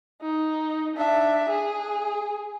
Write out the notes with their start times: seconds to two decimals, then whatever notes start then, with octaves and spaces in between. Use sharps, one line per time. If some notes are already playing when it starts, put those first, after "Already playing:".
0.21 D#4
0.95 D4 E5
1.49 G#4